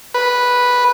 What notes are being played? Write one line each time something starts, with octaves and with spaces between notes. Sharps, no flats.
B4